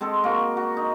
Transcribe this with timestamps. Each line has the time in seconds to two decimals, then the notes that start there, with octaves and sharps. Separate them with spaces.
0.01 G#3 C4 A4
0.24 A#3 F#4
0.57 F#4
0.77 D#4